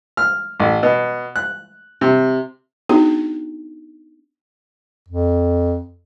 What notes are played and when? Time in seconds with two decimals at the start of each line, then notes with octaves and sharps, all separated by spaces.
0.17 F6
0.60 A1
0.83 B2
1.36 F#6
2.01 C3
2.89 B3 D4 D#4 F#4 G#4
5.09 F2